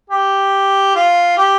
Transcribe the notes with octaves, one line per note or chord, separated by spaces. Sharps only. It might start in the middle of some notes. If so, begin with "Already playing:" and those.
G4
F4
G4